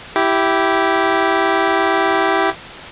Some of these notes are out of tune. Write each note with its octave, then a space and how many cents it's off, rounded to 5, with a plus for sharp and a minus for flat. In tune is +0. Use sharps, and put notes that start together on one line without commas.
E4 +0 G4 -10